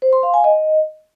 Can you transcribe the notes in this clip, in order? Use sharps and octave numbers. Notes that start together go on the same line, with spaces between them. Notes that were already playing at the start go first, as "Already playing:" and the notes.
C5
C6
F5
G#5
D#5